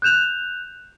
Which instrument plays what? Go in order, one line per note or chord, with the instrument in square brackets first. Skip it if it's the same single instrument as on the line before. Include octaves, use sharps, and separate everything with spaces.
[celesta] F#6 G6 E7 F7